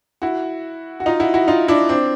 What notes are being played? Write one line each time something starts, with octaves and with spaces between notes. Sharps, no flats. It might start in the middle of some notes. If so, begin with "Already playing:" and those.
E4 F#4
F#4
D#4 F4
E4 F#4
E4 F#4
D#4 F4
D4 E4
C4 D4